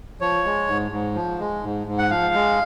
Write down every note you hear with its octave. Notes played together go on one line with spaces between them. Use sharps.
F3 C#5
G#3
G#2
G#2
F3
G#3
G#2
G#2
F#5
F3 F5
G#3